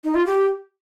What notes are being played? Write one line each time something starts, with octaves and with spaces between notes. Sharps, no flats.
D#4
F4
G4